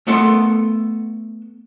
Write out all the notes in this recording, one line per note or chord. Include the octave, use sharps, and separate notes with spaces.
A3 B3 A4 F#5 C6